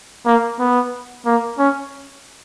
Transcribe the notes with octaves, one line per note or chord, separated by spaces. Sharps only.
A#3
B3
A#3
C#4